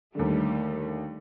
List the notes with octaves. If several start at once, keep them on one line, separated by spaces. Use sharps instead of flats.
D#2 D3 G3 A3